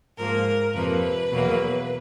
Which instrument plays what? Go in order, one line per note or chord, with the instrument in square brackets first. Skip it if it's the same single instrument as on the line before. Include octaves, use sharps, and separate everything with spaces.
[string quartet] G#2 F3 A#3 A#4
F2 C3 F3 A#3 B4
E2 B2 F#3 A#3